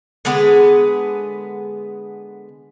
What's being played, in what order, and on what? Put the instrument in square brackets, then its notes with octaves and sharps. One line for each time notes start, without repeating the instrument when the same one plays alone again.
[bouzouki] D3 G#3 B3 G#4